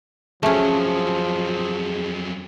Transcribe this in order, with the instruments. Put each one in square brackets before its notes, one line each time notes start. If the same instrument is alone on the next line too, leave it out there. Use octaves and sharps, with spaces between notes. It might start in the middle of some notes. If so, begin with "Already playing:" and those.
[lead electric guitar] F2 F#3 [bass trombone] F3 [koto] A3 C#4 [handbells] G#4